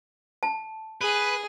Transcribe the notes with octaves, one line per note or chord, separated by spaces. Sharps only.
A5
G#4 B4